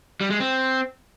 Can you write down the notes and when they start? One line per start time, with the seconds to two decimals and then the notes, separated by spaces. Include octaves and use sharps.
0.21 G3
0.30 G#3
0.40 C4